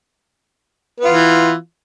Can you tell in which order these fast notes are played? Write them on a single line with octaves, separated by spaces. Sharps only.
B3 F4 E3